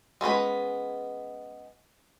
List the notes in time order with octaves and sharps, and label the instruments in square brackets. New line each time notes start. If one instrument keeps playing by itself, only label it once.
[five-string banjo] G#3 B3 C#4 B4